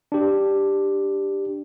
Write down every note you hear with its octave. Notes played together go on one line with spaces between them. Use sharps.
D4 G4